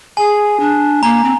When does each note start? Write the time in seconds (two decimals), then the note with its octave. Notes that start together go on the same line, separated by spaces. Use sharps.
0.17 G#4 G#5
0.60 D4
1.03 A#3 A#5
1.24 C4